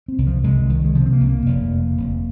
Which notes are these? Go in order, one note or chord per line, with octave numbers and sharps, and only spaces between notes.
C4
C2
F3
C2 G#3
C2 D#3
G#3
C3 F3
C4
A#3
C2
A#3
F1
F2
F1